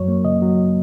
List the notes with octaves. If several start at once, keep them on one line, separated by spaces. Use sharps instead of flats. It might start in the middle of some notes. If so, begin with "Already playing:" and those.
Already playing: F#2 F#3 C#5
A#3
C#3 D#5
F#3